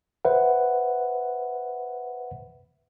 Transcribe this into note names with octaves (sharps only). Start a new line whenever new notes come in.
B4 C5 E5 F#5